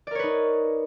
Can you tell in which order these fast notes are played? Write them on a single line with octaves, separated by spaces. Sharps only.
D5 A#4 C#5 B4 D#4